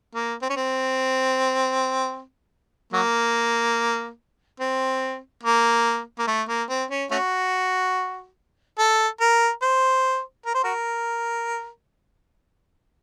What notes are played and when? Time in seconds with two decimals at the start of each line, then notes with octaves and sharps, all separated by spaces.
0.15 A#3
0.42 C4
0.50 C#4
0.57 C4
2.93 F#3 A#3
4.60 C4
5.43 A#3
6.19 A#3
6.28 A3
6.48 A#3
6.69 C4
6.91 C#4
7.11 A3 C#4 F#4
8.79 A4
9.21 A#4
9.62 C5
10.46 A#4
10.55 C5
10.64 F#4 A#4